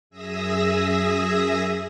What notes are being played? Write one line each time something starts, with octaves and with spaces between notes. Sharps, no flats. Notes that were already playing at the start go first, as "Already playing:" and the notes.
F#2 G#4 E5 D#6 E6 A#6